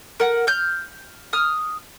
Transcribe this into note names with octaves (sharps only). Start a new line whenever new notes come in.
A#4 F#5
F6 G6
D#6 F6